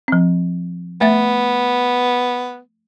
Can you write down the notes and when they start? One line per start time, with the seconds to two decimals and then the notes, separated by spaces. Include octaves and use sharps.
0.08 F3 C4
1.01 A3 B3 E5 A6